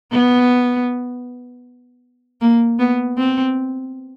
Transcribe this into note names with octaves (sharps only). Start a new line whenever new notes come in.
B3
A#3
B3
C4